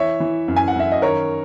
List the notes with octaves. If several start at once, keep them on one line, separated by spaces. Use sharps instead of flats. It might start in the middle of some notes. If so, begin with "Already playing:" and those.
Already playing: E3 C#5 E5
E3
F#2
G#5
F#5
F#2 E5
D#5
D#3 A#4 C#5